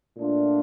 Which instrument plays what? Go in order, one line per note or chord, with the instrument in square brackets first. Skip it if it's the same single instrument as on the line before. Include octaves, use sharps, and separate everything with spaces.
[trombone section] A#2 A3 D4 F4